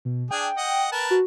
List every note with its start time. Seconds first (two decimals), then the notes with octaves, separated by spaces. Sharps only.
0.05 B2
0.31 D4 G#4 G5
0.57 D#5 F#5
0.92 A#4 B4 A5
1.11 F#4